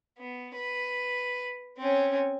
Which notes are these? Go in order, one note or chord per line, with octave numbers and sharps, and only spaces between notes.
B3
B4
C4 C#4